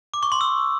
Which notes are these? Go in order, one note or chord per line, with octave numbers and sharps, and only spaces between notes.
D6
C#6
C6
E6